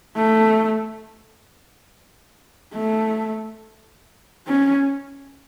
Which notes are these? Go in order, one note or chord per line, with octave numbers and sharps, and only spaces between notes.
A3
A3
C#4